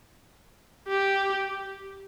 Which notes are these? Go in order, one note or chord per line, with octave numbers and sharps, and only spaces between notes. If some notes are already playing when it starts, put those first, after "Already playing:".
G4